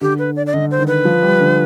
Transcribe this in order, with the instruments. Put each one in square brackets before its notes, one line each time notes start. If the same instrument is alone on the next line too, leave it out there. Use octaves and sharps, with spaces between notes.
[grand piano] D3 [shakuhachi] G4
[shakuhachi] B4
D5
D5
[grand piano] D3 [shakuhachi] D#5
[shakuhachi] C5
[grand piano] D#3
[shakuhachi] B4
[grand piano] F3
G3
D3